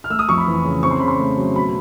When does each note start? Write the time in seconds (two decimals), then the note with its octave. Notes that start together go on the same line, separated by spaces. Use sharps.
0.04 F6
0.10 A3 E6
0.19 D#6
0.29 F2 C#6
0.38 B5
0.46 E3
0.64 C#3
0.83 C4 C#6
0.91 C6
1.00 C#3 B5
1.08 C6
1.19 A3
1.37 F#3
1.56 B2 B5